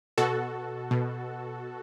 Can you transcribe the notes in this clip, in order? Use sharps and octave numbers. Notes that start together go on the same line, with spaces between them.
B2 F#4 A4
B2